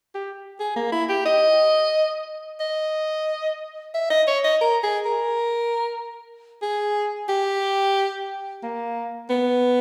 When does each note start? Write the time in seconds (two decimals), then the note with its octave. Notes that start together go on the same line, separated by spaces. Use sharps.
0.15 G4
0.60 G#4
0.76 A#3
0.92 E4
1.09 G4
1.26 D#5
2.60 D#5
3.94 E5
4.10 D#5
4.28 C#5
4.44 D#5
4.61 A#4
4.84 G#4
5.05 A#4
6.62 G#4
7.29 G4
8.63 A#3
9.30 B3